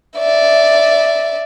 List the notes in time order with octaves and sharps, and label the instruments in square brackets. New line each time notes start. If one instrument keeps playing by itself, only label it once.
[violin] D5 E5